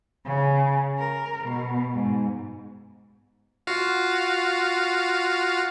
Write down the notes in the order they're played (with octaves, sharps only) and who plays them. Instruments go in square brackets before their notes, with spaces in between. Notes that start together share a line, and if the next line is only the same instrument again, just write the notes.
[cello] C#3
A#4
B2
G#2
[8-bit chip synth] F4 F#4 F5